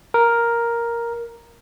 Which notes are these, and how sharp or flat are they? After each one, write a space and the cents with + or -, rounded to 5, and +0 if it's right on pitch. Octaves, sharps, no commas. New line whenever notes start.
A#4 +5